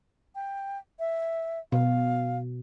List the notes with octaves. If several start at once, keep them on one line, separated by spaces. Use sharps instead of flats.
G5
E5
B2 F5